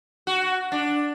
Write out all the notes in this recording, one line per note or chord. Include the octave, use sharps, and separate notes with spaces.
F#4
D4